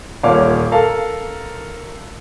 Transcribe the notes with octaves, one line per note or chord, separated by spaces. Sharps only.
D#1 A#2 C#5 D5 F5 D6
A4 A#4 F5 A5